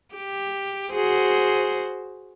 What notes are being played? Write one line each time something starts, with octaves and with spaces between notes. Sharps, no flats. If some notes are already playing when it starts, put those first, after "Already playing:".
G4
F#4 G#4 C5